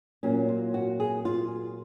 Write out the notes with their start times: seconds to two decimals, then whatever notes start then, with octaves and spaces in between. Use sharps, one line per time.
0.23 A#2 F#3 A#3 C#4
0.49 F4
0.74 F#4
1.00 G#4
1.25 F4